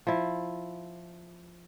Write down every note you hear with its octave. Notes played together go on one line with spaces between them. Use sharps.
F3 E4